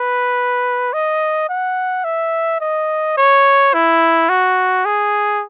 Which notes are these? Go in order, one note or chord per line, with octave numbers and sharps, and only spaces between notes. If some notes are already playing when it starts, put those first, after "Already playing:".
Already playing: B4
D#5
F#5
E5
D#5
C#5
E4
F#4
G#4